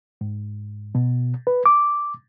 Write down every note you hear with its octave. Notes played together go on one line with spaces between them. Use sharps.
G#2
B2
B4
D6